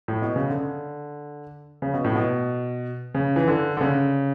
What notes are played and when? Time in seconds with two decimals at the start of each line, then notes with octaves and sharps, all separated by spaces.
0.08 A2
0.22 B2
0.36 C#3
0.50 D3
1.82 C#3
1.94 B2
2.05 A2
2.15 B2
3.15 C#3
3.36 E3
3.48 D3
3.77 D3
3.81 C#3